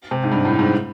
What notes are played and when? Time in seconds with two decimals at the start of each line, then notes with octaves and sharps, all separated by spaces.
0.11 C3
0.23 G#2
0.32 G2
0.45 A2
0.59 G#2